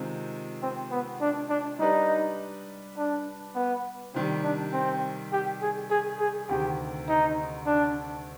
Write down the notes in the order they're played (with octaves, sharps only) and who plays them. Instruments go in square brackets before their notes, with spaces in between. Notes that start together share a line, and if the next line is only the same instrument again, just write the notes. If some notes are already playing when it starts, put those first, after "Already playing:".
Already playing: [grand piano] C3 D#3 G#3 C4 F4
[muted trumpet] C4
B3
D4
D4
[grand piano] G3 D4 G4 B4 D5 [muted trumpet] D#4
[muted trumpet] D4
B3
[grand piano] C3 D#3 G3 [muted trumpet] C4
[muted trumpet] D4
C4
G4
G#4
G#4
G#4
[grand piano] D2 C3 D#3 [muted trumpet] G4
[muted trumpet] D#4
D4